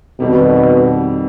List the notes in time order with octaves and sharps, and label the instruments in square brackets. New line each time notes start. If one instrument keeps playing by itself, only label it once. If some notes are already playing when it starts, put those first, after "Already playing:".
[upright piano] F2 D#3 G3 [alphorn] B2